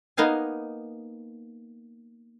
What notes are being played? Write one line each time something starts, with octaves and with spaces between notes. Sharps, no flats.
A#3 B3 D#4 F5 G#5